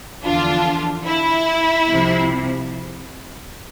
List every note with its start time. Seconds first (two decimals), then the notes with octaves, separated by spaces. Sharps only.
0.24 E2 D3 F3 D4 F4
1.06 E4
1.87 C2 C3 F3